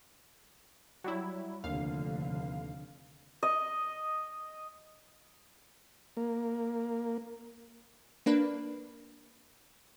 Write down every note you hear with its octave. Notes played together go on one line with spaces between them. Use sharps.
F#3 G3 E4
F1 D#2 D3 F5
D#5
A#3
A#3 D4 B4